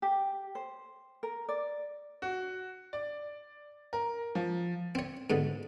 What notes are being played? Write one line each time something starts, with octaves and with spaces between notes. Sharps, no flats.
G4
C5
A#4
D5
F#4
D5
A#4
F3
C4 C#5
G#2 B2 D3